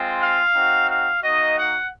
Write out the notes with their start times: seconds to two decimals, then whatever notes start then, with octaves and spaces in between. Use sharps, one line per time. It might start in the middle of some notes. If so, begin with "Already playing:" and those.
Already playing: G#3 C4 F4
0.21 F5
0.55 C4 D#4 F#4
0.89 F5
1.23 A#3 D#4 F#4 D#5
1.57 F#5